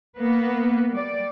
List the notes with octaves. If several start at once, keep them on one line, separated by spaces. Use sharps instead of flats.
A#3 B3 B4
G3 D5